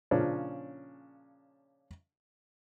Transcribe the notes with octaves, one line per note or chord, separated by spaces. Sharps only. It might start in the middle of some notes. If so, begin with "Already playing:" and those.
A#2 C#3 F3 C#4 D4